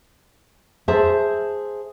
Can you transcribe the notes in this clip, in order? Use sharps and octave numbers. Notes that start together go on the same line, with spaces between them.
G#4 C5 E5 A5